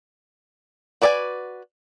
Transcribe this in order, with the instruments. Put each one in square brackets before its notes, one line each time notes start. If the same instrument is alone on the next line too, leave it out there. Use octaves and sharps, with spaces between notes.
[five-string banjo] F#4 B4 D5 D#5 G#5